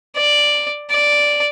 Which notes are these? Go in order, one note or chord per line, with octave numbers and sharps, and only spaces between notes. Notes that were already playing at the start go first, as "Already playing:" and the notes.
D5
D5